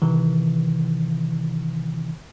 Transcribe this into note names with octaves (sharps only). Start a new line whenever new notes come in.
C3 D#3 E3